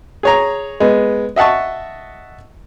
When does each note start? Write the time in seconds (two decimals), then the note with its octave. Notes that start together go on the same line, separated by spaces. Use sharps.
0.23 G#4 C#5 A#5
0.80 G#3 B3
1.36 D#5 E5 F#5 A5 C#6